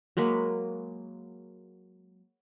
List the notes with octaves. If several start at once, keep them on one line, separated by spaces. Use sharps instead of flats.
F#3 G#3 A#3 B5